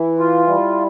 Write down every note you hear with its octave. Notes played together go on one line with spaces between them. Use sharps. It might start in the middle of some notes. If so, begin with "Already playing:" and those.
Already playing: E3 E4
F4
G3 E4